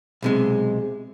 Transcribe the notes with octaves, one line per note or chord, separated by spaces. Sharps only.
B1 C3 G#3